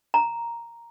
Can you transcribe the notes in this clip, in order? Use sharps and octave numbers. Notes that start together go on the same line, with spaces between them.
A#5